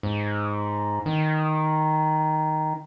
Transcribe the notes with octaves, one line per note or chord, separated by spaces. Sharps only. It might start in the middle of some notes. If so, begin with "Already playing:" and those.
G#2
D#3